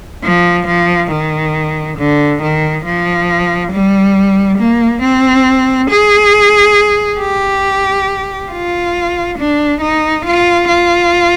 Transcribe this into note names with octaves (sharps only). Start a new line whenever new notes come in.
F3
F3
D#3
D3
D#3
F3
G3
A#3
C4
G#4
G4
F4
D4
D#4
F4
F4